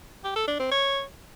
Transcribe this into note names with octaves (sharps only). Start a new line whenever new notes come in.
G4
A4
D4
C4
C#5